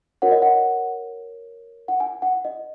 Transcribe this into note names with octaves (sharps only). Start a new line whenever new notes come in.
F#4 A#4 C#5 F#5
D#5
F#5
F#5
G#5
F#5
D#5